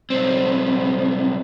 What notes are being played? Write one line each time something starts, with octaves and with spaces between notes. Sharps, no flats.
B1 C4